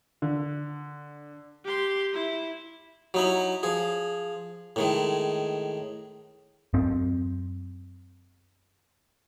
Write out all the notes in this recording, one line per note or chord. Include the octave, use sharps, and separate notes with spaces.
D3
G4 C6
E4
F#3 D#4 E4
F3 G#4
A2 D#3 G#3
F#2 C4